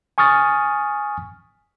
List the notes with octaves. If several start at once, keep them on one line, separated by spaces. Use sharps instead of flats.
G#5 C#6 D#6 F6 A6